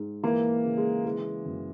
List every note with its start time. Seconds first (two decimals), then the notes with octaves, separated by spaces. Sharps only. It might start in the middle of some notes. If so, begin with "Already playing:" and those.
Already playing: G#2
0.23 E3 A#3
0.64 C#3
0.78 G#3
1.04 E3 G#3
1.45 F#2